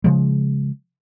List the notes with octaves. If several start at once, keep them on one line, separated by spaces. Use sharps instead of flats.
C#3 F3 G#3